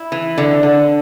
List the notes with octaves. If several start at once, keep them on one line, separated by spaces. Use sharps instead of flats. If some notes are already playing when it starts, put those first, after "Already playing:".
Already playing: E4
E3
D3
D3